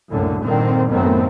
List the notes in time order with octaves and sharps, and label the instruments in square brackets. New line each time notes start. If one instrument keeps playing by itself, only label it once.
[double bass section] F#1 C2 F#2 A2 D3
G2 A#2 D3 D#3 C4
A1 F#2 D#3 A3 B3 C4